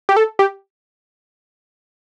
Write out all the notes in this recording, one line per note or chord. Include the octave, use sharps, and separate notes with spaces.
G4
A4
G4